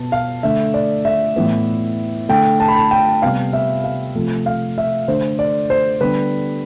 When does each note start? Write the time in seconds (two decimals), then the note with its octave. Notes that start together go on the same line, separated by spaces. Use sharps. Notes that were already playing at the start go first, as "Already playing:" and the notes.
Already playing: B2 B3 A5
0.12 F5
0.43 D3 A3 E5
0.74 D5
1.05 E5
1.36 A2 E3 B3
2.29 D3 A3 G5
2.60 A5
2.68 B5
2.76 A5
2.91 G5
3.22 C3 G3 B3 F5
3.53 E5
3.84 F5
4.15 C3 F3 A3
4.46 F5
4.78 E5
5.08 D3 A3 C5
5.39 D5
5.70 C5
6.01 D3 G3 B3 B4